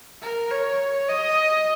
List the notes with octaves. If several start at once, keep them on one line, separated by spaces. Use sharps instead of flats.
A#4
C#5
D#5